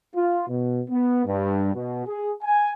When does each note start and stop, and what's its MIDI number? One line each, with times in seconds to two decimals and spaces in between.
0.15 0.45 65
0.49 0.82 47
0.90 1.25 59
1.26 1.72 43
1.74 2.04 47
2.06 2.33 68
2.43 2.72 80